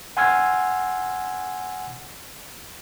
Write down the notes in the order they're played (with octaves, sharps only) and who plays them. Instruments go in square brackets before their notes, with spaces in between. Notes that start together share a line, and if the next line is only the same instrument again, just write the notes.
[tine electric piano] F#5 G#5 C6 E6 F6 G#6